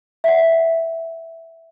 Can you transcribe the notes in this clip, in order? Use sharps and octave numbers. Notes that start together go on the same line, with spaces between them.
E5 F#5